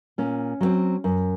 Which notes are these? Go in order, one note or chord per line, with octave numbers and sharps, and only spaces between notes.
A#2 C#4
F#3 A3 C4
F#2